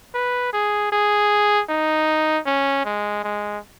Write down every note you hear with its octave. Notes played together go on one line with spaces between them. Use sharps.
B4
G#4
G#4
D#4
C#4
G#3
G#3